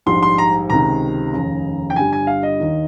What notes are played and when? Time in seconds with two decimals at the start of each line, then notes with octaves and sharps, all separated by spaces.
0.06 A#1 G#2 G3 C6
0.23 C6
0.38 A#5
0.70 C#2 C3 D#3 A#5
1.33 F1 D#2 C#3
1.90 G5
1.96 G1 G2 G3 G#5
2.13 G#5
2.27 F5
2.43 D#5
2.60 D#2 D#3